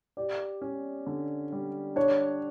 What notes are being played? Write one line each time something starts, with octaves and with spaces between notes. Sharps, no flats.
G4 D5
C#4
D3
G3
D4 C#5